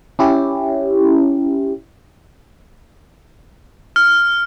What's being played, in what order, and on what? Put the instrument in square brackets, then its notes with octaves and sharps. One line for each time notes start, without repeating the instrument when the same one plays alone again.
[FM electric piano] C#4 E4 G4
[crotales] F6